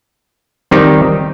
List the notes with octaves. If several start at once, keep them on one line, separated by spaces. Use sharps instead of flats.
D#3 G3 C4 D#4 G4